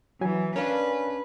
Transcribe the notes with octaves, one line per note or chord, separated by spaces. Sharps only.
E3 F#3 G#5
C#4 D4 A#4 B4 F5